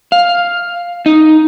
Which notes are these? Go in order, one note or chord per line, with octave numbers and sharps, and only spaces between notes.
F5
D#4